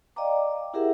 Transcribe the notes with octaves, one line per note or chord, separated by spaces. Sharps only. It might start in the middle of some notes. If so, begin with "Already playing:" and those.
D5 D#5 F5 G5 A#5 D6
E4 G4 G#4 A#4 E5 F#5